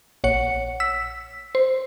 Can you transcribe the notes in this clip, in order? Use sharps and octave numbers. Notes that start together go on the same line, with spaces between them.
A#1 C#5 F#5 C#7
E6 B6
C5